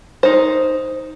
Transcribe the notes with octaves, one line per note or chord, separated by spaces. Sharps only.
D#4 C5